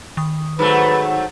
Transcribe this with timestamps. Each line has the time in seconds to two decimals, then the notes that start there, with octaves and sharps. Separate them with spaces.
0.17 D#3 D#6
0.59 G#2 F#3 A3 B4